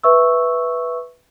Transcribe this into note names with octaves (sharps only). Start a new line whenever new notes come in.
B4 E5 C#6 E6